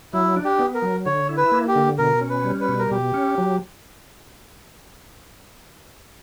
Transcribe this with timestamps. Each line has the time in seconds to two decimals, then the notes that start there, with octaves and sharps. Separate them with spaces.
0.13 F#3 E4
0.36 D4
0.45 G4
0.59 B3
0.75 A#4
0.82 F#3
1.06 D3 C#5
1.29 E4
1.37 B4
1.52 A#3
1.68 G4
1.76 D3
1.98 B2 A#4
2.21 C#4
2.30 B4
2.44 G3
2.60 B4
2.69 B2
2.79 A#4
2.91 B2 G4
3.14 C#4
3.38 F#3